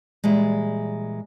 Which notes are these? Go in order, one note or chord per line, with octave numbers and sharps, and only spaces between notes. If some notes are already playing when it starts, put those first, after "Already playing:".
A#2 E3 G3 G#3